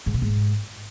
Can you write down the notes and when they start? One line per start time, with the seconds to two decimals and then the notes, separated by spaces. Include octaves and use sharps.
0.06 G#2
0.14 C3
0.22 G#2